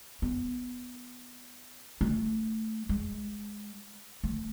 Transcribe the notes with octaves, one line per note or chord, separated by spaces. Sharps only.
B3
A3
G#3
A3